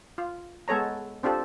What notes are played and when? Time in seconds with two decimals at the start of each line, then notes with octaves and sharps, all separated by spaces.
0.18 F4
0.68 G#3 B3 A4 C#5 A#5
1.23 C4 D4 F4 G4 A4